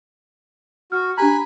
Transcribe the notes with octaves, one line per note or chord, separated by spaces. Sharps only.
F#4 F6
D4 G4 G#5 A#5 B5 F#6